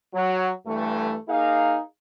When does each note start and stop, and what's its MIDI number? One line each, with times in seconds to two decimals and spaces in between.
0.13 0.50 54
0.66 1.17 43
0.66 1.17 52
0.66 1.17 57
1.28 1.79 58
1.28 1.79 63
1.28 1.79 68
1.28 1.79 77